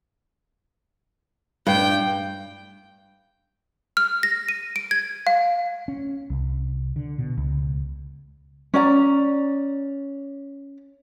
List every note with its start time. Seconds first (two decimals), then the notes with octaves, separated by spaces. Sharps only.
1.67 G2 G5
3.97 F6
4.23 A#6
4.49 D#7
4.76 D7
4.91 G#6
5.27 F5
5.88 C#4
6.30 C2
6.96 D3
7.18 B2
7.38 C#2
8.74 C#4 D5 A#5